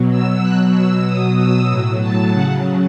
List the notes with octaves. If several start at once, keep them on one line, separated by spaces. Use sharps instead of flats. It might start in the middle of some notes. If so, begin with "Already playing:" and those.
Already playing: B2 F#3
E6
B2 F#3 F#6
E6
B2 F#3 D#6
E6
A2 F#3 E6
A5
C#3 F#3 F#5